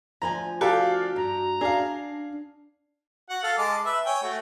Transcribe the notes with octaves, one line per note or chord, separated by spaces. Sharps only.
D2 F3 G#5 A#5
F#4 G4 A4 D5 F5
G2 A#5
D4 G#4 F5
F#4 F#5
A4 F5
G#3 A5 D6
B4 E5
C#5 G5 G#5
A3 F#4